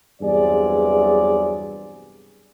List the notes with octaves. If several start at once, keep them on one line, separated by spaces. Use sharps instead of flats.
E2 G2 C3 F#3 G#4 D5